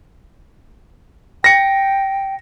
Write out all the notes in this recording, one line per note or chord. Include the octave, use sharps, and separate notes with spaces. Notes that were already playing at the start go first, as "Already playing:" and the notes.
G5 A#6 C#7